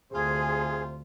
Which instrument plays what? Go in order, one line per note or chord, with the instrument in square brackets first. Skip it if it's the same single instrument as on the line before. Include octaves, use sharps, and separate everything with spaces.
[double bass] D2 [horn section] C3 F4 C5 [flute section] G#4